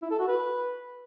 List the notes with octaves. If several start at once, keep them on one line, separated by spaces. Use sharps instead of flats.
E4
A4
F#4
B4